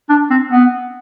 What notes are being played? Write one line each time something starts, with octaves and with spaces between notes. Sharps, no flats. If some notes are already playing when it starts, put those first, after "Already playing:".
D4
C4
B3